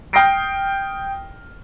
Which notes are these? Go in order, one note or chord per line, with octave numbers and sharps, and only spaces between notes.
G5 D#6 F6 A#6 C7 D7